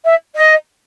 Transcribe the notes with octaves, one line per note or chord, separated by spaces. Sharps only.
E5
D#5